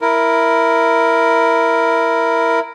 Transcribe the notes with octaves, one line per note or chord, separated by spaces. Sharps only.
E4 A#4